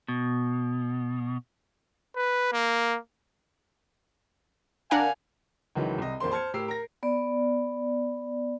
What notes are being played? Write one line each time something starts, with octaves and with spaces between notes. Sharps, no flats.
B2
B4
A#3
D4 A#4 F5 F#5 G#5
C#2 D#3 E3 F#3
C2 D#5
A#1 F2 A#3 C5 C6
C5 A5 F6 G#6 C#7
A2 G4 A#4 E6 C7
A#4 A#6
B3 D5